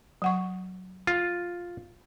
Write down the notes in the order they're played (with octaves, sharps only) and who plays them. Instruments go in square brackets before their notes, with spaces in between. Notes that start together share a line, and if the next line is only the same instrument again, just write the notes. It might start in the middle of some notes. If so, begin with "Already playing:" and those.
[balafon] F#3 F#5 C#6
[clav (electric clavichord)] F4